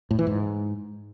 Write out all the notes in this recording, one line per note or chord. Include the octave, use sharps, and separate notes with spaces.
A2
E3
G#2